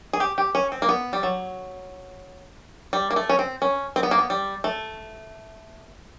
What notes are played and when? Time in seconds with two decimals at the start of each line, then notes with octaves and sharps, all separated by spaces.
0.13 G#4
0.20 G4
0.38 G4
0.55 C#4
0.72 C4
0.82 A#3
0.89 B3
1.13 G3
1.23 F#3
2.93 G3
3.11 A#3
3.16 A3
3.29 C#4
3.39 C4
3.62 C#4
3.96 C4
4.03 B3
4.11 A#3
4.19 B3
4.30 G3
4.64 A3